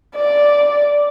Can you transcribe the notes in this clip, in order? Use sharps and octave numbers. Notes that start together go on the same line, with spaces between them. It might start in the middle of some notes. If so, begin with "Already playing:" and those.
D5